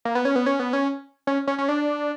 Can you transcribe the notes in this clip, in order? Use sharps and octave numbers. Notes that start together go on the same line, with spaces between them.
A#3
B3
C#4
B3
C#4
B3
C#4
C#4
C#4
C#4
D4